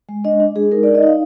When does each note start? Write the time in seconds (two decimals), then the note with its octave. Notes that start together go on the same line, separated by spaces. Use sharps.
0.09 G#3
0.25 D4 D#5
0.40 D4
0.56 G#3 G#4
0.72 D#4 A#4
0.83 D5
0.88 D#4
0.95 D#5
1.03 D#4 F5